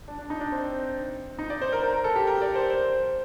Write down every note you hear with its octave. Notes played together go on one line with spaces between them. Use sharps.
D4
D4
D#4
D4
C4
D#4
D5
C5
A#4
A#4
A#4
A4
G4
A#4
D5
C5
C5